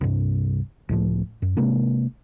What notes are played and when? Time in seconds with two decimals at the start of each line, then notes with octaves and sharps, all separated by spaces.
0.01 C2 G2
0.89 C#2 A2 F3
1.42 F#2
1.57 C3 G#3 A#3 D4